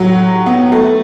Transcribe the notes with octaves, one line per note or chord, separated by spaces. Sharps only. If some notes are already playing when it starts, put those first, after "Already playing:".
Already playing: A2 F#3
B3
A3